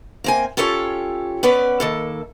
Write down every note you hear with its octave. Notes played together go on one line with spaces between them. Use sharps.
A#3 C4 G#5
C#4 F4 G4 A4 C#5
B3 C#4 B4 D5
D#3 A#3 A4